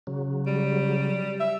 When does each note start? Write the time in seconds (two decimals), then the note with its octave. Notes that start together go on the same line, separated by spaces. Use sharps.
0.07 C#3 F#3
0.46 G3
1.40 E5